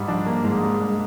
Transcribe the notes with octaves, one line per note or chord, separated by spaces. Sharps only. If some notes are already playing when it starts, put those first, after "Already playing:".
Already playing: G#2 G3
F3 D4
A#3
G#2 G#3
G3
D4